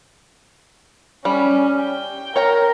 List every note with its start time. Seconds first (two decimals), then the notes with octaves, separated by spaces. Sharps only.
1.25 G3 C#4
1.80 G5
2.36 A#4 C#5 G5 A#5